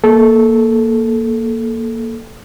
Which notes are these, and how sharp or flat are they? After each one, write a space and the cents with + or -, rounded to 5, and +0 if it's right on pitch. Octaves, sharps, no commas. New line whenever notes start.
A#3 +0 A4 -15